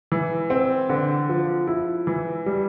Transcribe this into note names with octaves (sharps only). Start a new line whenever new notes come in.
E3
C4
D3
F3
E4
E3
G3